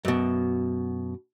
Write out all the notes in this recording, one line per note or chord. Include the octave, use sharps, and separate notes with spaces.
F#2 B2